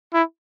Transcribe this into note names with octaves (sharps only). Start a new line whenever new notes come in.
E4